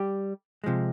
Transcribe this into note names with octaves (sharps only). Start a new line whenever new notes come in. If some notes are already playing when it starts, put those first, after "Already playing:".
Already playing: G3 G4
C3 F3 G#3